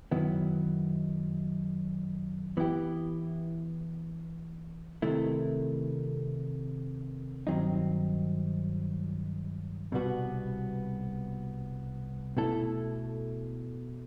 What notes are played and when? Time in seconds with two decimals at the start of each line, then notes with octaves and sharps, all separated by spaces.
0.11 F#2 D#3 F#3 B3 E4
2.57 E3 B3 E4 G4
5.02 C3 D#3 A3 E4
7.47 G2 D#3 F#3 C4 D#4
9.92 C2 B2 G3 B3 F#4
12.37 B2 A3 E4 A4